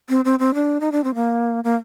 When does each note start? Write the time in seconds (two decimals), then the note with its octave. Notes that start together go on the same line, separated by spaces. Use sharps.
0.09 C4
0.25 C4
0.39 C4
0.54 D4
0.80 D#4
0.92 D4
1.04 C4
1.15 A#3
1.64 A#3